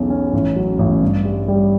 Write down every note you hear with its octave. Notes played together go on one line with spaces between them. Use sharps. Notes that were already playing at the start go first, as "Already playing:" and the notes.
Already playing: B1 E2 C#4
C#4
A1
F#3
A1
G2
G3
G3